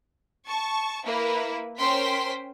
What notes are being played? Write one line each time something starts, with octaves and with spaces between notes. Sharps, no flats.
A5 C#6
A#3 E4 B4
C#4 A#4 C5 G5 C6 B6